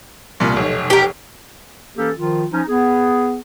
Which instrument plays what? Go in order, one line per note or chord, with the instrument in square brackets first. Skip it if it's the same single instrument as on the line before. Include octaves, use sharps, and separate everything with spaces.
[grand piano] C2 A#2
F1 B1
[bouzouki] G4 A#4
[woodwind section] E3 A#3 C#4 G4 A4
D#3 F3 F4
F3 C#4 D#4
B3 G#4